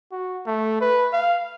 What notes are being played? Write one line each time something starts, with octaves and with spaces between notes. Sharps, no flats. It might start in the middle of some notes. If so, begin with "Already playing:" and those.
F#4
A3
B4
F5